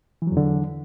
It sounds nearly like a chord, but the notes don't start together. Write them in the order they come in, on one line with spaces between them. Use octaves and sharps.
E3 F#3 E2 D3